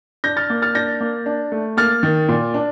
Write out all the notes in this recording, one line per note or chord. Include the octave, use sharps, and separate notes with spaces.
D4 G6 A#6
F6 A6
A#3
F6 A6
D4 G6 A#6
A#3
D4
A3
A#3 F6 A6
D#3
A#2
D4